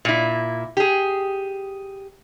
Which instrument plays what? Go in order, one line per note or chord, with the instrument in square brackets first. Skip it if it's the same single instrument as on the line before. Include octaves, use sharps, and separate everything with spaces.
[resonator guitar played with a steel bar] A#2 E4
G4 G#4